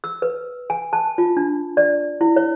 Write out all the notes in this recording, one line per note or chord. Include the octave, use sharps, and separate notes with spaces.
E6
B4
G#5
A5
F4
D4
D5
E4
C#5